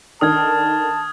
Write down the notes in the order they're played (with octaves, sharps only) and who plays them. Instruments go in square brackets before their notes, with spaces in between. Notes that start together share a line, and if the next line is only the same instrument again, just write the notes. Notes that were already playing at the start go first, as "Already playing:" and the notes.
[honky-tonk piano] D#3 D4 A4 [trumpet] A5 [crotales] D#6 F6 G#6